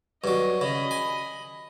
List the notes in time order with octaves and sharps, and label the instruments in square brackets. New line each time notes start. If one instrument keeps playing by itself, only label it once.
[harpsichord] G2 F#3 [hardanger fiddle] D#5
[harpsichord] C#3 [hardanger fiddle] D#5 B5
[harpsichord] G#5